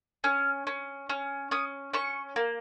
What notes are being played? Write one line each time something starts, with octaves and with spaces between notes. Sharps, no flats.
C#4 F6
C#4
C#4 F6
C#4 D#6
C#4 C#6
A#3